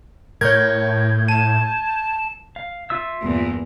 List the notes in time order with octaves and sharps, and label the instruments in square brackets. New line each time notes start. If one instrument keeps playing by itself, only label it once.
[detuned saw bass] A2 [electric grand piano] A#4 C#5 [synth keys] G6 G#6
[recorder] A5 [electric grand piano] D#7
[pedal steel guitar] F5
F4 E5 E6
[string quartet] E2 G2 A#2